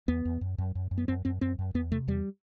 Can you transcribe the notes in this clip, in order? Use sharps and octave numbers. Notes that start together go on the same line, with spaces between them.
E2 B3
E2
F#2
F#2
F#2
F#2
B3
F#2 C4
F#2 C4
F#2 C4
F#2
E2 B3
C3 A3
E2 G3